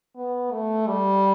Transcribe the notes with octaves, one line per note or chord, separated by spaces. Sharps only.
B3
A3
G3